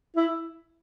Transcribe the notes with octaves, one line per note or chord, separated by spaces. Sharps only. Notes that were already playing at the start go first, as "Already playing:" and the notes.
E4